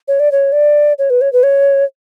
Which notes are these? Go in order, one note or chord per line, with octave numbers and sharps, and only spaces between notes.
C#5
D5
C#5
D5
C#5
B4
C#5
B4
C#5